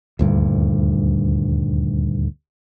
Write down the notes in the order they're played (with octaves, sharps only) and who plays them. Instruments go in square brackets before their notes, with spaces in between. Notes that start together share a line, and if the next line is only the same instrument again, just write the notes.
[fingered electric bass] D#1 D2 G2